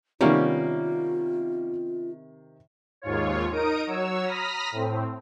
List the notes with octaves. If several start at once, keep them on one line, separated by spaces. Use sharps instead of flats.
C3 D#3 G3 A#3 B3 C#4 D#4 F4
D#2 G#2 F4 C#5
D#4 A#4 D#6 D7
F#3 C#5 E6
A#5 B5 D#6 F6 A#6 B6
A2 C4